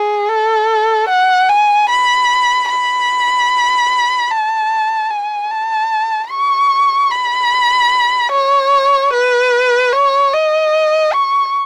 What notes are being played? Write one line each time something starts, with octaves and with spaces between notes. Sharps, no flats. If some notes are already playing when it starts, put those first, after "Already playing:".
Already playing: G#4
A4
F#5
G#5
B5
B5
A5
G#5
A5
C#6
B5
C#5
B4
C#5
D#5
C#6